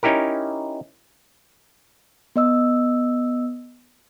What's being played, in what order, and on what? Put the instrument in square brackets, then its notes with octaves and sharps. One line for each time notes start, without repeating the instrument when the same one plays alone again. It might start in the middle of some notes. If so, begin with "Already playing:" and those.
[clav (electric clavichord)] C#4 D#4 E4 G4 A#4
[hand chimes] B3 D#5 E6